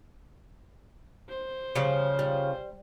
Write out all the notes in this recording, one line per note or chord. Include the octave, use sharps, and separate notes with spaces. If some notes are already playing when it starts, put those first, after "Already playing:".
C5
C#3 F3 G3
G3